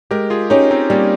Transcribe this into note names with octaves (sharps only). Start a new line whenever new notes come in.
G#3 G4 A#4
F4 G#4
C#4 D#4 G4
C4 D#4
G3 A#3 C#4